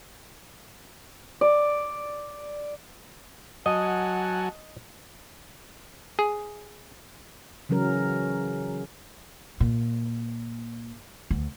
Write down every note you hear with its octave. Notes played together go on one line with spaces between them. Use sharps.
D5
F#3 D#5 F#5 G#5 A5
G#4
C#3 E3 F#3 C#4 A#4
A#2
D2